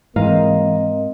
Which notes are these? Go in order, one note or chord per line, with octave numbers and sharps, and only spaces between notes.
G#2 E3 A#3 C4 D#5 F5 A#5